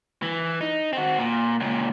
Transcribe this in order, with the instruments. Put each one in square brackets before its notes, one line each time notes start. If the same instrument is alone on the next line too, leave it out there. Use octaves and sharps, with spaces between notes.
[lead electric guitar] E3
D#4
C4 F#4
A#2
C#2 A#2